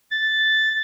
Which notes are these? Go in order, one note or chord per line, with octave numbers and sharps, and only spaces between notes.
A6